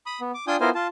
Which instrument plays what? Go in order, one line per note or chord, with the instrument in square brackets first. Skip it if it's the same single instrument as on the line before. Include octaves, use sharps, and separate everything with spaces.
[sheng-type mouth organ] B5 D#6
B3
D6
D4 F4 G5 G#5 D#6 G6
B3 E4 F4 A#4 C5 G#5
F4 A5